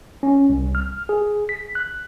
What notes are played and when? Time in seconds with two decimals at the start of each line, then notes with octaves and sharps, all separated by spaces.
0.23 C#4
0.50 C2
0.75 F6
1.09 G#4
1.49 B6
1.75 F#6